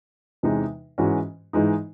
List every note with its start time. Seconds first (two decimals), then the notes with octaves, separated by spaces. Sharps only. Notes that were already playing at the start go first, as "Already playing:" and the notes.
0.43 E2 C3 E3 G#3 D#4
0.98 G#2 E3 G#3 C#4 F#4
1.53 G#2 E3 G#3 D#4